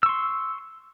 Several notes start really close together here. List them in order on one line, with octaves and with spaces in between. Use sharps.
E6 C#6 C6